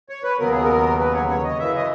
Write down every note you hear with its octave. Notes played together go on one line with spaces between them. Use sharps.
C#5
B4
D#2 C#3 F#3 B3 A#4
G#4
A#4
B4
C#5
C#5
D#5
F#2 C#3 E3 E5
D#5